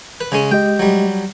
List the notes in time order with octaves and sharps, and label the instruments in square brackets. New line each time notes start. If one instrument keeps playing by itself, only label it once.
[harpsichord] B4
C#3 G#3 C#4
[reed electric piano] G#3 G4 D#5 [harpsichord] G5
[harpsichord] F#3 G3